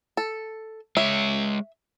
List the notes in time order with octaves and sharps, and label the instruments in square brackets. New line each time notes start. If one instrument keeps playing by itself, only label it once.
[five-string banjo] A4
[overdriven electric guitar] G#3 C#5 [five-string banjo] E5